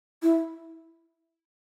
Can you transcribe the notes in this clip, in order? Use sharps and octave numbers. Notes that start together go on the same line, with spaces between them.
E4